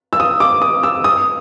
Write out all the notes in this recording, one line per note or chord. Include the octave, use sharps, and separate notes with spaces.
E6
D#6
D6
D#6
E6
D#6